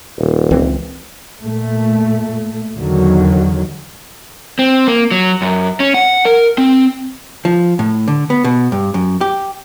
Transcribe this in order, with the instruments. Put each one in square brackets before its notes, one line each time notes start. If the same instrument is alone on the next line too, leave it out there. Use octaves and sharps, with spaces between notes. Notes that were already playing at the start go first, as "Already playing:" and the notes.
[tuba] D#1
[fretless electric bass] C#2 E3 C4
[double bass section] A#2 A3
E2 D3 D#3 F#3
[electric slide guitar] C4
A#3
F#3
F#2
C#4
F#5
A#4
C4
[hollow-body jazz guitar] F3
A2
D3
B3
B2
G2
F#2
G4